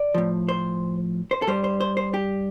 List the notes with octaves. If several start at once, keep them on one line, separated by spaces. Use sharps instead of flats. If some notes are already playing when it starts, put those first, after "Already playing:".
Already playing: D5
A2 F3
C5
C5
A4
G2 G3 C5
C5
C5
C5
G4